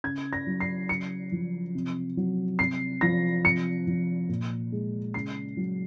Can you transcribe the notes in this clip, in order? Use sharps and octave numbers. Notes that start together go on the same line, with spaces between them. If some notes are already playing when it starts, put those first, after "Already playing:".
C#3 G#6
A#6
F#3
C7
C#3 C#7
F3
C3
F#3
C3 C7
F3 A#6
C3 C#7
F3
A#2
G#3
C#3 C7
F#3